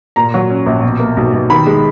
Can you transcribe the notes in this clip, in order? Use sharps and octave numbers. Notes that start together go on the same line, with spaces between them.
A#2 A#5
F#3
C#4
A#1
B2
A#3
B1
B1
D#3 B5
G#3